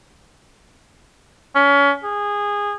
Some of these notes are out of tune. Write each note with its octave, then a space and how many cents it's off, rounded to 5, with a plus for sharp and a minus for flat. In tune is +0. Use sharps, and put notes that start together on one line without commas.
C#4 +30
G#4 -20